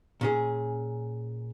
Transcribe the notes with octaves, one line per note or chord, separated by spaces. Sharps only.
A#2 C#4 G#4